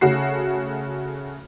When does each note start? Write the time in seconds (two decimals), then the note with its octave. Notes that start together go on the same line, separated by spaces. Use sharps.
0.01 C#3 A3 F#4 C7